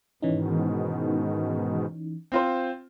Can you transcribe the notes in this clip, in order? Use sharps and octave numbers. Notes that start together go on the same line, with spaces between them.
G#2 B2 D#3 E3 C#4 D#4
C4 F4 C5